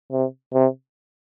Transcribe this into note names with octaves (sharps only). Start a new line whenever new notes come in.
C3
C3